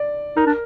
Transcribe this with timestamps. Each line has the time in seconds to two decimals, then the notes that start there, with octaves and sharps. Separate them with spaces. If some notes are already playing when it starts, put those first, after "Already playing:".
Already playing: D5
0.37 D#4 A#4
0.47 D4